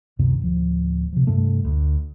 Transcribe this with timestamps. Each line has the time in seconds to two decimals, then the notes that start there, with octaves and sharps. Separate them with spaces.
0.19 C#2 F#2 C3 D#3
0.41 D1 F3
1.13 C3 F3
1.27 G2 C3 A3
1.65 D2